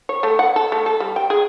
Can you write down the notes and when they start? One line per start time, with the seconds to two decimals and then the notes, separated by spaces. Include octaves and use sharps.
0.09 C#5
0.23 A3
0.39 F#5
0.56 A4
0.72 A3
0.86 A4
1.00 G3
1.16 G5
1.30 G#4